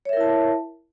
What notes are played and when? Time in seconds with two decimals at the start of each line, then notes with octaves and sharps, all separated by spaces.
0.05 C#5
0.09 E5
0.13 A#4
0.17 E4
0.21 A5